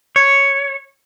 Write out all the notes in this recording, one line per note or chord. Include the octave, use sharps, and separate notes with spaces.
C#5